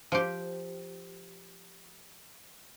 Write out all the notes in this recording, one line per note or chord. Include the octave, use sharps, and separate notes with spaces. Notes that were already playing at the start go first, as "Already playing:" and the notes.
F3 G4